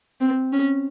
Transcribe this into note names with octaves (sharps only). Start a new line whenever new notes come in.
C4
C#4